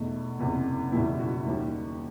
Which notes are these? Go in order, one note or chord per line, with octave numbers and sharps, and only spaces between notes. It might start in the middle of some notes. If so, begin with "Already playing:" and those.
Already playing: E2 B2 A3 D#4
F#1 E2 C3
F#1 E2 B2 G3 E4
F#4
D#2 D#3 G3